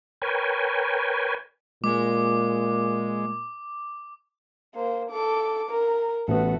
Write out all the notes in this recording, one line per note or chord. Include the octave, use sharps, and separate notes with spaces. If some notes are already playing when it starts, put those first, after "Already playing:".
A#4 B4 C#5 G5 G#5
A#2 G#3 D6
A#3 C5
A4 D6
A#4
A1 A3 B3 F#4